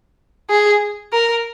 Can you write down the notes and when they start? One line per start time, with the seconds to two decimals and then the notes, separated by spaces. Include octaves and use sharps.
0.50 G#4
1.13 A#4